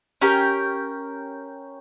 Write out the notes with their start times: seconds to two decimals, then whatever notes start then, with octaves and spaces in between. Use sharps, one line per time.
0.22 C#4 G4 A#4